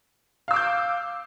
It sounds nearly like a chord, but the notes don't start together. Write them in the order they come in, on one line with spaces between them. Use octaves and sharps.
F5 E6 D6 G6